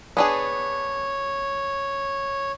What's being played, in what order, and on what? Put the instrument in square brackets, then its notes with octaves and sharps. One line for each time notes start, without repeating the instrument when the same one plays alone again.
[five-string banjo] B3 D4 G#4 [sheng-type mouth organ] C#5